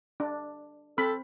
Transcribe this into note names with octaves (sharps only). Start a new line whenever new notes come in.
D4
C4 A4 B5